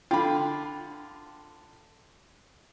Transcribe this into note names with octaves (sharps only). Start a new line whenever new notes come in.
D3 F4 G5 B5